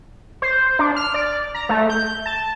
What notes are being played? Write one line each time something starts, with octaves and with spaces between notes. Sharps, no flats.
C5
D4
F6
D5
A#5
A3
G6
A5